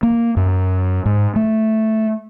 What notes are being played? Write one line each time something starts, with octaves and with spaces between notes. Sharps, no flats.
A#3
F#2
G#2
A3